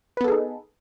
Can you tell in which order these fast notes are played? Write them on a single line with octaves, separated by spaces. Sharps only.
B4 B3 A4 G#4 D#4